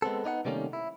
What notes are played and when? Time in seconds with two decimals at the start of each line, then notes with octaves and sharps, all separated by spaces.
0.02 G#3 B3 C4 A4
0.24 B3 D#4 D5 F#5
0.45 C3 D#3 G3 A3 A#3 C#4
0.73 E4